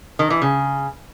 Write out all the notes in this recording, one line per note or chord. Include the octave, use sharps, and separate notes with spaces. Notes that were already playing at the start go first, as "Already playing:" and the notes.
D#3
E3
C#3